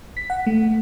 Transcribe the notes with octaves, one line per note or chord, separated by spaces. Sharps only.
B6
F#5
A3